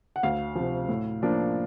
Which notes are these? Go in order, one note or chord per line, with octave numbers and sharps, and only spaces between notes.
F#5
D2 F5
C3 F3
A2
F3 A#3 D4